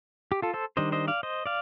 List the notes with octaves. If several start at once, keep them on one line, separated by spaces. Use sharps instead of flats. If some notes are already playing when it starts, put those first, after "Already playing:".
G4
F4 A4
A4 C5
D#3 G3 D4 C5 D#5
C5 D#5
D5 F5
C5 D#5
D5 F5